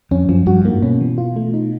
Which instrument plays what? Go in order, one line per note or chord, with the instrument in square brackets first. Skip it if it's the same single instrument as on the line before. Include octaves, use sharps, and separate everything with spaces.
[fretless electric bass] F2 [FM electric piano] C#4
[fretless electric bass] F#2 [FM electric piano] F3
[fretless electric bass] G2 [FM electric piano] F#4
[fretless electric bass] G#2 [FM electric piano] A#3
[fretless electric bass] B2 [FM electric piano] C#4
[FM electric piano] E3
F4
A3
D#4